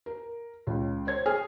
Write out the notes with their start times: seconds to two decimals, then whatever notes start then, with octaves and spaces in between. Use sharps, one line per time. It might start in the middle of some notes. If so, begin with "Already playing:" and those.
0.06 A#4
0.67 C#2 C#3
1.07 C5 C#5 G#6
1.26 G#4 F6